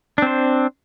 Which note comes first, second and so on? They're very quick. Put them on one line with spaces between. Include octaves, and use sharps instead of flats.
D4 C4 C5